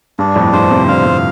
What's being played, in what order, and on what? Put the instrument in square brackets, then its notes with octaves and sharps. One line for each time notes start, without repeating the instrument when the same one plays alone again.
[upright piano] G2 [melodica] D4
[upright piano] F2 A2
[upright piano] G2 [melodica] C5
[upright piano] G2 C3
[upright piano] A2 D3 [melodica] F5
[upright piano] G2 C3